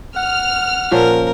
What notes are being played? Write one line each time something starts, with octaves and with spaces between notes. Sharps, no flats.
F#5 F6
A#2 F3 C#4 A#4